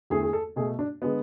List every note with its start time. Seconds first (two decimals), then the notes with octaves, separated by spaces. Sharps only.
0.10 E2 D3 A3 G#4
0.23 G#4
0.33 A4
0.56 B2 A3 G#4
0.79 D4
1.02 D3 G#3 B3